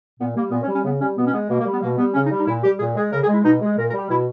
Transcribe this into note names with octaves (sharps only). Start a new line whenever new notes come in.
A#2 B3
G3 A#3
A#2 B3
C#4
G3
C#4
C#3 B3
G3 C#4
B2 B3
C#4
G#3 B3
B2 A#3
A#3
G3
B3
B2 A#3
G3 B3
C#3 C#4
D#4
G3
D#4
A#2 E4
G3 G4
A#2 G#4
G#3 G#4
C#3 A#4
G#4
G#3
E4
B2 D#4
G#3
G#4
A#2 A#4
A#4
G3
G4
B2 E4